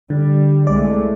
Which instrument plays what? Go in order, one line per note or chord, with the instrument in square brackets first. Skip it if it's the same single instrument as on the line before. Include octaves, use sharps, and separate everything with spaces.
[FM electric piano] D3 [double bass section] G3
[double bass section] C2 G#3 A3 [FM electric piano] D5